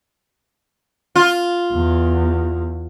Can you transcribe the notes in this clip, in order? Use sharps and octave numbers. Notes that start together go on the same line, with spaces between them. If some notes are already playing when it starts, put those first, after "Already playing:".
F4
E2